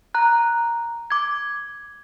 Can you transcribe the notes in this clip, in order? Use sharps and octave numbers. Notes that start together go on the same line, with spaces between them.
A#5 F#6
D6 G#6